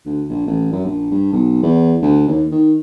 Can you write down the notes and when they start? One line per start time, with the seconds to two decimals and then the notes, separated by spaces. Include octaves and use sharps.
0.05 D2
0.29 A#1
0.47 A1
0.72 F#2
0.85 A#1
1.11 G2
1.33 B1
1.63 E2
2.02 D2
2.28 D#2
2.51 D#3